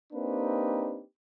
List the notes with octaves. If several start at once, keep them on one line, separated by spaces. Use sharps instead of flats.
A#3 C4 D4 D#4 G4 B4